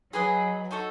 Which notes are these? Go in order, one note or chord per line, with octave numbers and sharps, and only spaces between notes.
F#3 G#4 B4 D#5 G#5
D#4 F#4 A4